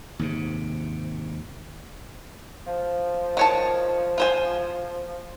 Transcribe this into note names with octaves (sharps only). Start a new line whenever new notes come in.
D#2 G#2 C3
F3
D#3 C#5 A5
F4 C5 G#5